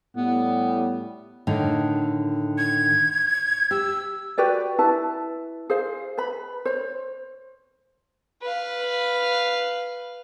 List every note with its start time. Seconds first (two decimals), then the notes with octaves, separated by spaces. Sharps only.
0.17 A2 G3 B3
1.47 A2 D3 D#3
2.58 G#6
3.71 G4 E6
4.38 F#4 G4 B4 D5
4.79 E4 B4 A5
5.70 G#4 C5 F5
6.18 B4 B5
6.65 C5 C#5
8.42 B4 F5